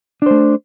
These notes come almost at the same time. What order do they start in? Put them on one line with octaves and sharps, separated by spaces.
D4 C5 A3